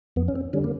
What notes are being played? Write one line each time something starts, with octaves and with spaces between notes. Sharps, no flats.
F2 B3
C#4
C4
D3 G3 C#4
A#3